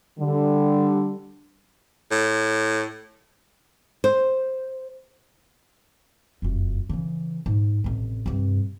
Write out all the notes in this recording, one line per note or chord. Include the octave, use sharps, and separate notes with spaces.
D3 G3
A2
C5
F1 F#2
C#3 E3
G#2
A1 C3
G2 C3